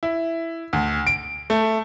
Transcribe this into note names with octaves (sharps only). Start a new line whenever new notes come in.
E4
D2
D7
A3